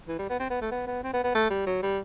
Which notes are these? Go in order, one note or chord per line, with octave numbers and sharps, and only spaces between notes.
E3
G3
B3
C4
B3
A3
B3
B3
C4
B3
B3
A3
G3
F#3
G3